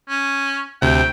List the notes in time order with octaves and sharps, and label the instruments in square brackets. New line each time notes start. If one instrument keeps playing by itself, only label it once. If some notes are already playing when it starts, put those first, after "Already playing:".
[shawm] C#4
[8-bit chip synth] D2 C3 [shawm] G5